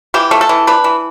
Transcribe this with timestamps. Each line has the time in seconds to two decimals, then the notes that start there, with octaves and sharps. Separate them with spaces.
0.14 E3 G4
0.31 A3
0.41 A4
0.49 E3
0.67 D4 B4
0.84 E3